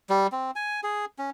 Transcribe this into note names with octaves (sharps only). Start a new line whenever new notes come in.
G3
C4
G#5
G#4
C#4